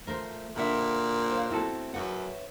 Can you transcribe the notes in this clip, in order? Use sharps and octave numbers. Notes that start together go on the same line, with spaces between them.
F3 A3 A#4 C5
A#2 D3 E5 F#5 B5
C5 C#5 F5
A3 C4 E4 F#4 A4
F#2 B4 C#5 E5 F#5